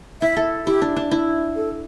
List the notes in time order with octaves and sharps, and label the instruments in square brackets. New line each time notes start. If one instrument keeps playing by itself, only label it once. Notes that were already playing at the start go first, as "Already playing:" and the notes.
[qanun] E4 [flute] E5
[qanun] A4
[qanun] E4 [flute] G4
[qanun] D4
D4
E4
[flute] A4